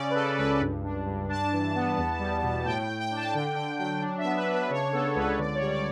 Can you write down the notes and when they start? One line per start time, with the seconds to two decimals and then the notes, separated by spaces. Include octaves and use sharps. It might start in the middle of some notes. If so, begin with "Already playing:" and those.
Already playing: C#3 C#4 D5
0.10 B4
0.15 C#3 A4
0.38 C#2 B4
0.61 G2
0.83 D4
1.06 G2
1.29 D4 A5
1.52 E3
1.75 B3
1.98 E2
2.19 G3
2.43 B2
2.65 A2 G5
2.82 G5
2.88 A2
3.00 G5
3.11 D4
3.16 A5
3.33 D3 G5
3.56 D3 G5
3.79 F#3 G5
4.02 D4
4.18 E5
4.24 B3
4.36 B4
4.47 D4
4.53 B4
4.70 C#3 C#5
4.92 B3 A4
5.15 C#2 B4
5.38 D3 D5
5.55 C#5
5.61 G3
5.72 D5